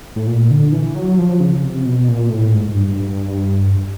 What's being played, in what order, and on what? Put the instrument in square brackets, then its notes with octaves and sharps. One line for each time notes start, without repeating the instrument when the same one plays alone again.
[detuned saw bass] A2
A#2
D3
E3
F#3
F3
C#3
C3
B2
A#2
A2
G#2
G#2
G2